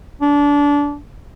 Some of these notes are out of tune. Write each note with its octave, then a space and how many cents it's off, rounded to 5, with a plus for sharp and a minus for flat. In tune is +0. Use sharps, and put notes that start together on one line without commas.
D4 -25